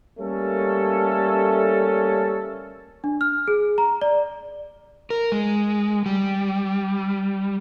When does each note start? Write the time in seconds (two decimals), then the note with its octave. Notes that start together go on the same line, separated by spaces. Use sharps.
0.19 G3 A3 A#3 C#4 A4
3.04 D4
3.21 F6
3.48 G#4
3.78 A#5
4.01 D5
5.10 A#4
5.32 G#3
6.06 G3